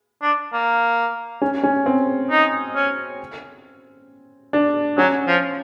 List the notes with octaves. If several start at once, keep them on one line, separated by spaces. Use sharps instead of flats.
D4
A#3
C#4
C#4
C4
D#4
C#4
D4
F#3 C#4
F3